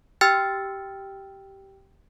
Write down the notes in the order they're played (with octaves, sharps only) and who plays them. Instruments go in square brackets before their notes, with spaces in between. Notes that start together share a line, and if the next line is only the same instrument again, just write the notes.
[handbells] G4 G5 E6 F6 A6 C#7